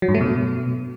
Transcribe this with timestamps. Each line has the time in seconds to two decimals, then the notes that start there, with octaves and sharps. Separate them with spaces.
0.02 F#3
0.08 G2
0.15 A3
0.21 B2